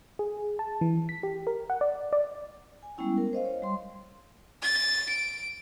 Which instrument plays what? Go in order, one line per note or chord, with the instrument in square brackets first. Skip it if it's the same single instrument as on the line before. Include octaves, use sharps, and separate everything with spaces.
[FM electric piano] G#4
A5
E3
B6
G4
A#4
F#5
D5
D5
[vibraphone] G#5
G3 G#3 B3 C#4 E4 G5
A#4
C5 D#5 F5
C#5 F5
G3 C6
[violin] A6
D7